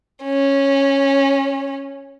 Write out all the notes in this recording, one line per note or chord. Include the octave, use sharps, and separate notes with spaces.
C#4